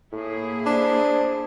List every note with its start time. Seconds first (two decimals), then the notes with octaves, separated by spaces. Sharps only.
0.12 A2 A#3 E4 G#4
0.66 D4 C5